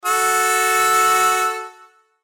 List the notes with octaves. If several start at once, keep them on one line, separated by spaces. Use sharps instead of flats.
F#4 A4 E6